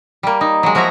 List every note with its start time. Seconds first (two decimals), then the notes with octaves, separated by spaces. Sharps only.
0.23 G3 A#3
0.41 D#4
0.63 F#3 G#3
0.75 F3 F#4 G#4 E5 A#5